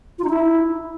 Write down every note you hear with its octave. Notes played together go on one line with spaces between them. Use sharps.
F4
D#4
E4